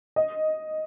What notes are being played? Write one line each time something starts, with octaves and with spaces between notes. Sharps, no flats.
D#5